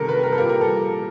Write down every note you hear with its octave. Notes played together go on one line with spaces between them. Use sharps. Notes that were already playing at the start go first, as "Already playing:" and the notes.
Already playing: C3 D#3 G3 A4 A#4
B4
A#4
A4
A#2 G3 A#3 A#4
A#4
A4